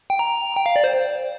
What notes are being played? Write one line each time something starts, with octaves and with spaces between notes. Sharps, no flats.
G5
A#5
G5
F5
D5
C5